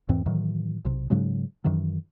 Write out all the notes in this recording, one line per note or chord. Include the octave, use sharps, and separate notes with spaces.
E2 G#2 E3 C4
A2 D#3 E3 F#3
B1 C3
G#2 C#3 F#3 G#3
F#2 D#3 E3 F#3